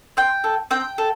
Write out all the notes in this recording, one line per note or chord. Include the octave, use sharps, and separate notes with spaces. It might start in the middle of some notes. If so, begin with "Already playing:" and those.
C4 G5
A4
C4 G5
A4